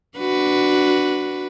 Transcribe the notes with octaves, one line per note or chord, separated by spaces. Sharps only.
D4 F#4 B4